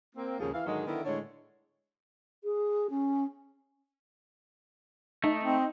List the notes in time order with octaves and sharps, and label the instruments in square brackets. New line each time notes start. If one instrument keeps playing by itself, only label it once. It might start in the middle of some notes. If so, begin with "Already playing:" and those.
[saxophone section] A#3 C4
D#2 G#2 C#3 F3 A#3 G#4
E3 F5
G#2 D3 D#3 F#3 G#3
D3 D#3 B3 D4 E4
A2 D3 G#3 C#5
[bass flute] G#4
C#4
[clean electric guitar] A3 [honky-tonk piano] D#4
[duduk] C4